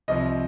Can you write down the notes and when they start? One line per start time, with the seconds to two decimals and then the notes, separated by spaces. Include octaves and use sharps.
0.08 C2 C3 F3 D#5